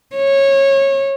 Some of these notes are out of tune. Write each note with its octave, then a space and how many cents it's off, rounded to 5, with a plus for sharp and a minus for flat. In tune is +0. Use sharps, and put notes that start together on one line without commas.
C#5 -20